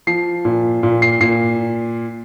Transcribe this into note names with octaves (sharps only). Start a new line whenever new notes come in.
F3 C7
A#2
A#2
C7
A#2 C7